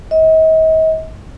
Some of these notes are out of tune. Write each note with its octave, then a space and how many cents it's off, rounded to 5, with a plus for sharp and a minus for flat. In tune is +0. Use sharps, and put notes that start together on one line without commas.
D#5 +40